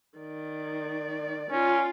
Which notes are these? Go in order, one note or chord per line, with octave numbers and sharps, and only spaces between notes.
D#3 D5
C#4 F4